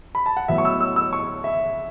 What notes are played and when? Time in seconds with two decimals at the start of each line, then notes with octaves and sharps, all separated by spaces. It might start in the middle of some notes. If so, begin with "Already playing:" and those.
0.15 B5
0.26 A5
0.37 F#5
0.48 A2 F#3 B3 E5
0.58 C#6
0.65 E6
0.81 E6
0.96 E6
1.13 C#6
1.44 E5